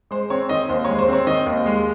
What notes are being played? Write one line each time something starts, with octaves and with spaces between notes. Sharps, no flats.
G#3 C5
C4 C#5
D#3 D#5
D#2 C5
C#5
G#3
C5
C4 C#5
D#3 D#5
D#2
G#3